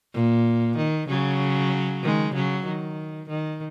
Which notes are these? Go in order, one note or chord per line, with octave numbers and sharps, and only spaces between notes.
A#2
D#3
C#3 F#3
D#3 G#3
C#3 F#3
D#3
D#3